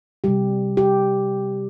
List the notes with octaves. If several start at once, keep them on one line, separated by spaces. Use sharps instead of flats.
C3 G3 G4
G4